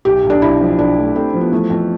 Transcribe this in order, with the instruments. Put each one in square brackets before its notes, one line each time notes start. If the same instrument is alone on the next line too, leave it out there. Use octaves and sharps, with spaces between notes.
[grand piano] B1 [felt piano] G4
[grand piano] B1
[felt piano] D4
[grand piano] B1 [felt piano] E4
[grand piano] F3
[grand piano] B1 [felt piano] D4
[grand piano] A3
[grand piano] A3 [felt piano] C4
[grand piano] F3
[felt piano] B3
[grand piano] E3 [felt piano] A3
[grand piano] F2